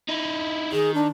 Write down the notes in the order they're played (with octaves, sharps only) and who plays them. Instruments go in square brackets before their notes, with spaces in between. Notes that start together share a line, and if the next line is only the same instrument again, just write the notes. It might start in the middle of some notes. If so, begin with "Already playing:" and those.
[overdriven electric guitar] D#4 E4
[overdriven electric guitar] D#3 [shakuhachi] G#4
[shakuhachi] D4